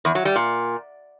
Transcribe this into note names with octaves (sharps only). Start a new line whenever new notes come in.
E2
F#3
G3
A#2